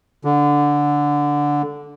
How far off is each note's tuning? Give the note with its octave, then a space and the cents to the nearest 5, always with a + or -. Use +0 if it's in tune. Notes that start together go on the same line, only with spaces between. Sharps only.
D3 -10